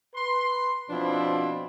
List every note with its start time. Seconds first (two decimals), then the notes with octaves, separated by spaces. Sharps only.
0.14 B4 C6
0.89 B2 F3 C4 D4 E4